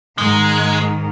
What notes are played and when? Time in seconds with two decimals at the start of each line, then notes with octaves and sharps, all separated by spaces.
0.18 G#2 D#3 G#3